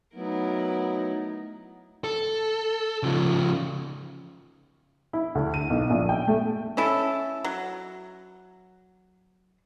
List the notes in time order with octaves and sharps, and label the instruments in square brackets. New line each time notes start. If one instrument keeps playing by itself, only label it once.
[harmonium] F#3 B3 [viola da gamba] A3 E4 A#4 [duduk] D#4
[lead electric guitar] A4
C#3 F3
[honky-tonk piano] E4
D2
D#7
B1
A#1
G5
A3
[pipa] C#4 E4 A4
F#3